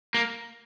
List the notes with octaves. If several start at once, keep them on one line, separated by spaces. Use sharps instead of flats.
A#3